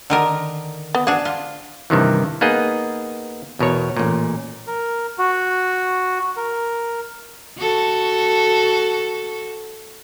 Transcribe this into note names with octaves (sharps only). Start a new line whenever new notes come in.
D3 D#3 A#4
B3
D4 G#4 F#5
F4
G2 C3 D#3 E3
A#3 B3 D#4 G#4 D#5
E2 B2 A#4 C#5
A1 A#2
A#4
F#4
A#4
F#4 A4